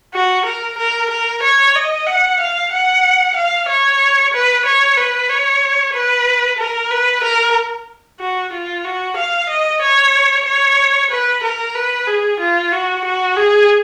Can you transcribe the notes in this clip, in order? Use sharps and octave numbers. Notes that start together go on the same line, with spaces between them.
F#4
A#4
A#4
A#4
C#5
D#5
F#5
F5
F#5
F5
C#5
B4
C#5
B4
C#5
B4
A#4
B4
A#4
F#4
F4
F#4
F5
D#5
C#5
C#5
B4
A#4
B4
G#4
F4
F#4
F#4
G#4